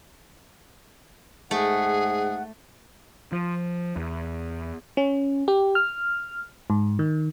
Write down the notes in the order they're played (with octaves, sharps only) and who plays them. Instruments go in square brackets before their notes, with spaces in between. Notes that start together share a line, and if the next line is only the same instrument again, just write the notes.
[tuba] G#2 [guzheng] A3 [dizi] G#4 [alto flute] F#5
[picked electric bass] F3
E2
[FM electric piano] C#4
G4
F6
G#2
D#3